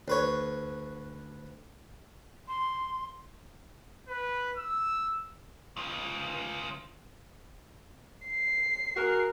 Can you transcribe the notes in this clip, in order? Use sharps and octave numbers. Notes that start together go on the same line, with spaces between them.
D2 B4 C#5
C6
B4
E6
C#3 F3
C7
F#4 G#4 A#4